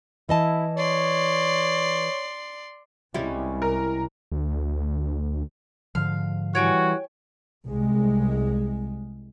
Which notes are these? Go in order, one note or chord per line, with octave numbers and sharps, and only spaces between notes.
E3 E4 D#5 A5
C#5 D5 C6
C2 G3 G#3 C#4 E4
A#4
D2
G#2 D3 F3 F5
E3 G3 F#4 C#5 G5 G#5
C2 G#3